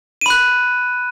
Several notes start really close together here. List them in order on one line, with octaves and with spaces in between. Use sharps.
D#7 B5 F#6